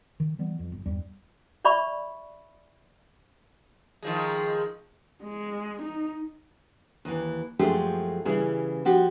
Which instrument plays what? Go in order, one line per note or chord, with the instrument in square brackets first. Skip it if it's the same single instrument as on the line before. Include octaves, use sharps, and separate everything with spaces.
[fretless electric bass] D#3
E3 G3 B3
F2
G1
E2 G2 G3
[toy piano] C#5 D5 E5 B5 C#6
[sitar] D#3 F3 G#3
[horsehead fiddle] G#3
D#4
[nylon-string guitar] D#2 E3
F#2 F3 G#3 A3 G4 G#4
C#3 E3 G3 E4 G#4
F3 F#4 G4